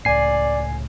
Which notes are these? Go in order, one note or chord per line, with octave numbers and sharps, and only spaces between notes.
C#2 A2 D5 G#5 C7